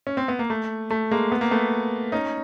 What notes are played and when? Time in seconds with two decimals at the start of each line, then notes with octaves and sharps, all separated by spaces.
0.07 C#4
0.17 C4
0.28 B3
0.39 A#3
0.50 A3
0.90 A3
1.11 G#3 A#3
1.32 B3
1.41 A#3
1.51 A3 B3
2.12 C#4 D#4